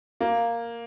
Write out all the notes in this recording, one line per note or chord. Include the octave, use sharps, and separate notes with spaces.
A#3